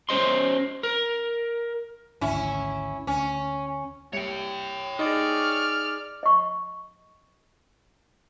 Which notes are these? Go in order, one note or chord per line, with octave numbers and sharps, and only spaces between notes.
C#4 C5 D#5 C6
A#4
G#1 D2 C#4 E4
D2 C#4
C2 C#5 G5 C#7
D#4 G#4 D5 F6
D#5 C#6